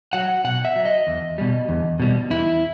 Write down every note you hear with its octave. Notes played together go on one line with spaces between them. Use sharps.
F#3 F#5
B2 F#5
E5
F#3
D#5
E2
B2 G3
E2
B2 G3
E2 E4